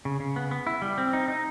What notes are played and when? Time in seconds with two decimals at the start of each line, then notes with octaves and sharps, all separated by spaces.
0.05 C#3
0.20 C#3
0.36 B3
0.51 B3
0.67 E4
0.82 G3
0.98 C4
1.13 D#4
1.28 D#4